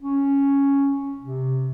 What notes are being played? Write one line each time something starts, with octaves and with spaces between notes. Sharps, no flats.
C#4
C3